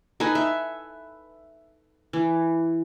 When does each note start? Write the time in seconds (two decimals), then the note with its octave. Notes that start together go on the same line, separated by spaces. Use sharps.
0.20 D#4 A4 B4 G#5
0.35 E5
2.13 E3